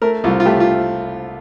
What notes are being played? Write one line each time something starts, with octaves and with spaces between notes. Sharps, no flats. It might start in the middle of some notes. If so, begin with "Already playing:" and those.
A3 A#4
C2 F4
F4
A3 G4
F4